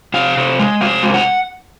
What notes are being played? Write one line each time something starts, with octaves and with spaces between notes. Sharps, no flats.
C3 F5
C3
G#3
C3 F5
G#3
F#5